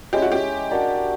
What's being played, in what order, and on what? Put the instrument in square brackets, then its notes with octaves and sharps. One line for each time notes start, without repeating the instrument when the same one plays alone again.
[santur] G#3 C#4 E4 [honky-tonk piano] G4
[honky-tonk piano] F#4
G4
[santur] D4 F#4 A#4 D5